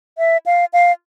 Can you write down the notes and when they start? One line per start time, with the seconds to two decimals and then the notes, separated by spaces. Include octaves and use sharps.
0.18 E5
0.46 F5
0.73 F5